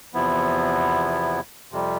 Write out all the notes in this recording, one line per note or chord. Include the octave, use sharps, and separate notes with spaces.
E2 C3 F3 B3 E4
F2 C3 G3